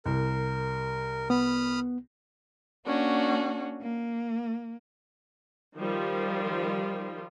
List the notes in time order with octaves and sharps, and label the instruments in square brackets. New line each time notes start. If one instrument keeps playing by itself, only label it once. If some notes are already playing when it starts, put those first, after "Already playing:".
[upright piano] C2 [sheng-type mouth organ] A#4
[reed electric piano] B3 [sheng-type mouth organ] B5 D#6 F6
[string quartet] A#3 C#4 D4 F#4
A#3
[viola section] D#3 F3 G3 F4